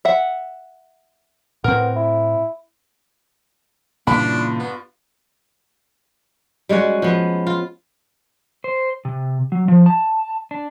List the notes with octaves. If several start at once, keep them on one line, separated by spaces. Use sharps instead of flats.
E5 F#5
A2 B3 C4 A#4
E4
G2 A#2 C#3 E3 D4 F4 B5
B3
G3 G#3 C#4 F#4
F3 B3
F4
C5
C3
F#3
F3
A5
D4